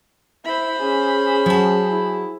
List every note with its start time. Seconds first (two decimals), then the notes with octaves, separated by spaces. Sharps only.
0.45 E4 C5 B5
0.80 C#4 G#4
1.46 F#3 A5
1.90 E4